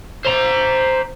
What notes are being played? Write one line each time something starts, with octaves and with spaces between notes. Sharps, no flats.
C5 A#5